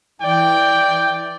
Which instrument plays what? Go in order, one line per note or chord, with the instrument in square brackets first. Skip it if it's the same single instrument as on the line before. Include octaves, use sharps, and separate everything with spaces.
[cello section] E3 [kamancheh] D5 [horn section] G5